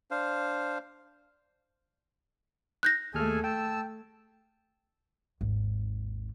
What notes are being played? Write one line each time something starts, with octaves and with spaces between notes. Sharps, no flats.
D4 C5 F5
F#6 G6 A#6
D#2 A3 G#4 A4 G#5 F6
G5 A5 E6
G#1 D#2